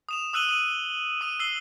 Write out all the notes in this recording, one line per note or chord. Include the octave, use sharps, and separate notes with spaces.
D#6 E7 F7
D#6 E6 F#6 D#7 F#7 G7
D#6 D#7
D#6 D#7
E6 C7 G7